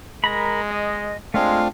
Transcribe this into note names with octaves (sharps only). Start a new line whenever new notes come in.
G#3 A#4 A#5 B5
D#5
G#3 A3 C4 D4 F4 F5